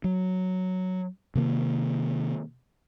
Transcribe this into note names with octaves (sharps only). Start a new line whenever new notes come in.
F#3
C3 D#3 A#3